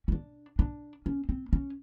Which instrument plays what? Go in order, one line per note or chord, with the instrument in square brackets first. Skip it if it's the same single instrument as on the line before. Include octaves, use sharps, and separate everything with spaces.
[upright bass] C#4
D4
D4
C#4
C4
C#4